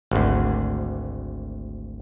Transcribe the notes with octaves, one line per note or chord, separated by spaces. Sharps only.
G#1 D2